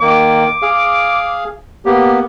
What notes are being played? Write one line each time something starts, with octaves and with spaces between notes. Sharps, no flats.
D#3 A#3 D6
G#4 F5
A#3 B3 G4